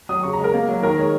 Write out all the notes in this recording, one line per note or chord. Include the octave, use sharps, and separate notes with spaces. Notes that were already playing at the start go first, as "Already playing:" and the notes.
F#3 D#6
C#3 C#6
A#5
G#3
A#4
A#3
F#3
D#3 A#4
G#3 C#5